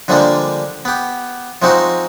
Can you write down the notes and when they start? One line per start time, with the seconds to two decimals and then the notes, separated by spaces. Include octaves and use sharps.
0.08 D3 F3 G3 G#3 A#3 D4
0.85 B3 G4
1.62 F3 G#3 C4 D#4 F#4